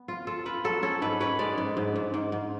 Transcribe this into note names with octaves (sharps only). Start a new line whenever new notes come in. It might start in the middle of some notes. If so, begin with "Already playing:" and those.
Already playing: B3
F4
F4 A4
F4 B4
F#3 A4
C#4 A4
G#2 B4
C#4 B4
G#3 D5
G#2
G#2
G#2
G#2
G#2